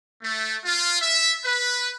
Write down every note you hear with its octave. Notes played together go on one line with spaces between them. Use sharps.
A3
F4
E5
B4